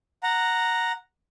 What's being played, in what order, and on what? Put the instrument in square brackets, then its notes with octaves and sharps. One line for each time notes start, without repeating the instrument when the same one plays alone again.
[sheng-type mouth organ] F#5 A#5